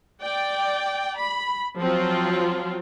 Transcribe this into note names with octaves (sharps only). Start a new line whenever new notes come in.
D5 G5
B5
F3 F#3 C4 F4